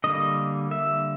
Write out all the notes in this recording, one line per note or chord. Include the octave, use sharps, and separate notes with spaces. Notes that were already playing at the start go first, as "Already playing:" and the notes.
D3 G3 A#3 D#5
E5